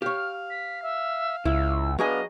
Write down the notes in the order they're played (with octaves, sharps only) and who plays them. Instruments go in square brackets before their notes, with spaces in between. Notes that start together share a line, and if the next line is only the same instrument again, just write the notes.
[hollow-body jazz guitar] G4 C#5 [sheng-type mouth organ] F5 [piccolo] F6
[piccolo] B6
E5
[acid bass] C#2 [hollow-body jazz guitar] E4 [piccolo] E6
[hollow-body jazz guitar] F#3 G#4 G#5 [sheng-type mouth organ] B3 D4 F5 [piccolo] D#5